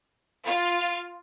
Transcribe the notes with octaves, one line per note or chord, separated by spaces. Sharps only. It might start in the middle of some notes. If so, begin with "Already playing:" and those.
F4